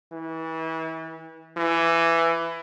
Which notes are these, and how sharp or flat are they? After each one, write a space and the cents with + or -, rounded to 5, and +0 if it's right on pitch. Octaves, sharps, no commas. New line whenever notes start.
E3 -30
E3 +15